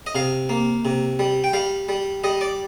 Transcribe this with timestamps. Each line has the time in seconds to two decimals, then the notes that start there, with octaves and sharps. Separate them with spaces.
0.06 D#5
0.15 C3 F5
0.49 A#3
0.85 C3
1.19 G3
1.44 G5
1.53 G3 F5
1.89 G3
2.24 G3 D#5
2.41 D5